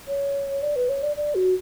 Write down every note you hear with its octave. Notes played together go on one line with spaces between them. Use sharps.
C#5
D5
B4
C#5
D5
D5
F#4